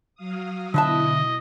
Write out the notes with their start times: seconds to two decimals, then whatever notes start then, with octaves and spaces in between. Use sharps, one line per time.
0.15 F#3 F5 D#6
0.74 B2 D3 F3 E4 B4 D#5 E5 A5